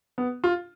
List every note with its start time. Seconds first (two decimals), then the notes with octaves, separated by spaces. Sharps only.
0.18 B3
0.44 F4